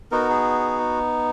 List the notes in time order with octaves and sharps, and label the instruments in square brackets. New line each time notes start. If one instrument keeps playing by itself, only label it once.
[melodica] B3 D#4 F#4 A#4
G#4